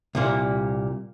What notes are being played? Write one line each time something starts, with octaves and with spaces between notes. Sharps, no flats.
C2 A#2 G3 A#3